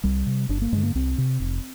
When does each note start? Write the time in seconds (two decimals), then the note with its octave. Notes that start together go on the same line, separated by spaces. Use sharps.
0.04 C2 G3
0.27 C3
0.49 G1 D4
0.62 A#3
0.72 G2 D3 G#3
0.83 A#3
0.95 C2 C4
1.18 C3
1.40 F1